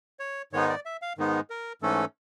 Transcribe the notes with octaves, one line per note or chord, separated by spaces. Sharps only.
C#5
G#2 D#3 G#3 B3 D#4 C#5
D5
E5
F5
G#2 D#3 G#3 B3 D#4
A#4
G#2 E3 A3 C#4 A4